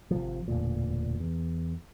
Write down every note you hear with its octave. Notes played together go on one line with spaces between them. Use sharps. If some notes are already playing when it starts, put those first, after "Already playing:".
G#1 C3 F3
E1 D2 A#2
E2